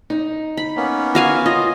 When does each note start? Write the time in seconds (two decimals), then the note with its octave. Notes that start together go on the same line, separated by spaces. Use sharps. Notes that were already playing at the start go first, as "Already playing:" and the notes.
0.10 D#4
0.57 B5
0.76 A#3 B3 C#4
1.15 F#4 F5 G#5
1.46 F4 D#5